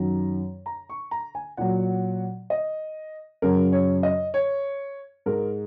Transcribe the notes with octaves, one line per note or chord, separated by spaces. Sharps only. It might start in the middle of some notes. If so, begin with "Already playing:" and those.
Already playing: F#2 D#3 F#3 A#5
A#5
C#6
A#5
G#5
A#2 F#3 F#5
D#5
F#2 C#3 F#3 A#4
C#5
D#5
C#5
G#2 G#3 A#4